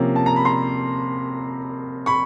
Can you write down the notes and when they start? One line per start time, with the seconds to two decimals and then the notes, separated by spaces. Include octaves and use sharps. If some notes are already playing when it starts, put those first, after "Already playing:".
Already playing: C3 F3 A#3 C#4
0.16 A5
0.26 A#5
0.36 B5
0.45 A#5 C6
2.06 B5 C#6